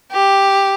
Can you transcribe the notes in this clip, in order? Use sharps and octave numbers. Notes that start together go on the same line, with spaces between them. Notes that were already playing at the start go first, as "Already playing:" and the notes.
G4